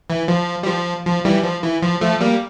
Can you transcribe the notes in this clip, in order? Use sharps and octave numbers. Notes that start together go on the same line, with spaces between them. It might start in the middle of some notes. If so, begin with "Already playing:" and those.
E3
F3
G3
F3
F3
E3 G3
F3
E3
F3
F3 A3
G3 A#3